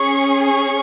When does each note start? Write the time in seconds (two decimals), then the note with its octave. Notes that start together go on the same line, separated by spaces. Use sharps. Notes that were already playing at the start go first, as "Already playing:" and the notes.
Already playing: C#4 G#4 C#6
0.44 C#6